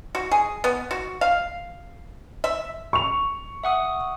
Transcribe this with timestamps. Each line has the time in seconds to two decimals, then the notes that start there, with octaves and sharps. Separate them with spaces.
0.15 F#4
0.31 G#4
0.64 B3
0.91 F#4
1.21 F5
2.44 E5
2.93 C#6 F7
3.64 E5 F#5 D#6